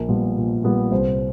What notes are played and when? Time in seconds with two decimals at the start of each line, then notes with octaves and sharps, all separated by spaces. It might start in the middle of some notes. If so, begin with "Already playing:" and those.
Already playing: A#1 A#4
0.08 A#2 G3 B3
0.37 A#1
0.64 A#2 G3 B3
0.91 C2 C5